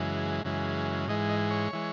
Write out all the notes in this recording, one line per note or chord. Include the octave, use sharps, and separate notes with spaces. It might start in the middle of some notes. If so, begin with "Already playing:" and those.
Already playing: F#2 C#3 E3 G#3
F#2 C#3 E3 G#3
G#2 E3 G#3 D#5
D#5
C#5
E3 G#3